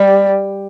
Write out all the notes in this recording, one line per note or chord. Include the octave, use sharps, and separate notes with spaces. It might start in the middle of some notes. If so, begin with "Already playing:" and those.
Already playing: G3